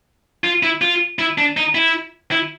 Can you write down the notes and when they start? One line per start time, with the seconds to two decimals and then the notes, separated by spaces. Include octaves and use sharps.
0.44 F4
0.63 E4
0.81 F4
1.19 E4
1.38 D4
1.57 D#4
1.75 E4
2.31 E4